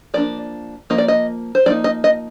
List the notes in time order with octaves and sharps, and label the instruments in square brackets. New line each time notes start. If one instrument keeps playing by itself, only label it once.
[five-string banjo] F3 A#3 D4 D5
F3 A#3 D#5
D5
D#5
C5
F3 A#3 D#4 D5
D#5
D#5